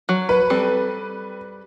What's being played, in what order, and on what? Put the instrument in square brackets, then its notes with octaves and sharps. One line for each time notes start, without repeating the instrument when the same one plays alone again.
[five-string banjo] F#3
[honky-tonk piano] B4
[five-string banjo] G3 C4 A4